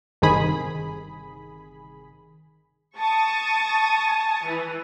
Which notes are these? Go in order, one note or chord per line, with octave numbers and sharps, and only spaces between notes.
G1 C3 D#3 G#4 B5
A5 C#6 D#6 A6
E3